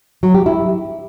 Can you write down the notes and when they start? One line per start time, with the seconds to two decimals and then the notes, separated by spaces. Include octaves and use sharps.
0.23 F#3
0.34 G4
0.46 E4